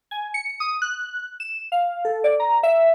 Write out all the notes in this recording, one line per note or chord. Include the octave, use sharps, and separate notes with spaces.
G#5
C#7
D#6
F#6
E7
F5
A4
D5
A#5
E5